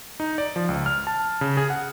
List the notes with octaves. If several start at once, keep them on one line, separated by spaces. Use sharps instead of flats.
D#4
D5
F3
C#2
F6
A5
C#3
G#4
F#5